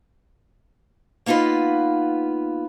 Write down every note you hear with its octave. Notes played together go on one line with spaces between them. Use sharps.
A#3 B3 D#4 F4 B4